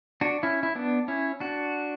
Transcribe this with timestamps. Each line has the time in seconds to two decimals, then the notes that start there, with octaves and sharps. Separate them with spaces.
0.21 D4 F#4
0.43 C#4 E4
0.63 E4
0.75 B3 D4
1.08 C#4 E4
1.40 D4 F#4